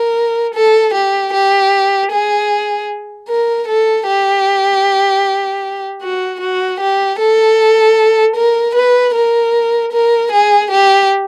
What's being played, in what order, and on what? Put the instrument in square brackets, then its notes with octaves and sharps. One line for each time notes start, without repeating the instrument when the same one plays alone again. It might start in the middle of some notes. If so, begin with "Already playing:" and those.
Already playing: [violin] A#4
A4
G4
G4
G#4
A#4
A4
G4
F#4
F#4
G4
A4
A#4
B4
A#4
A#4
G#4
G4